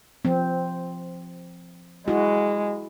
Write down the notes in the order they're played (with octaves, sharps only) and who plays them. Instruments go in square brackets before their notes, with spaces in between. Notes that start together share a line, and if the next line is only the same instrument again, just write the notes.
[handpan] F3 C4
[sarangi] G#3 [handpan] E4 F#4